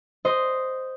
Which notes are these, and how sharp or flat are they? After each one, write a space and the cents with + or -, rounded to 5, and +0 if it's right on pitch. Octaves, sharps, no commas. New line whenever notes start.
C5 -5 D#5 +0